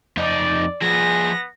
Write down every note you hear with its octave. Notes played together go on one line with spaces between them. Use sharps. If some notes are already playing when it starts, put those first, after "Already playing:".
F2 D#4 D5
F3 B3 G#4 A#6